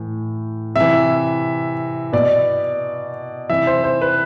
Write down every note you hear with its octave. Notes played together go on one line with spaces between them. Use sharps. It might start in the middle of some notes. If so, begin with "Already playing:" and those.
Already playing: A2 E3
C3 E3 E5
B2 D5
C3 E3 E5
C5
C5
B4